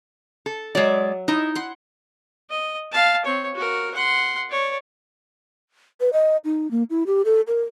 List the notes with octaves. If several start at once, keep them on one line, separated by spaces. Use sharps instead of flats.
A4
F#3 G#3 D5 E5
D#4 E4 E5
F#5 C6
D#5
F5 A5
C4 C#5
F#4 A#4
F#5 C6
C#5 D5
B4
D#5
D#4
A#3
E4
G4
A4
A#4